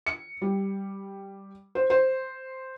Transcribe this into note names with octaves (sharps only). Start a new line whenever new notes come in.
C#7
G3
C5
C5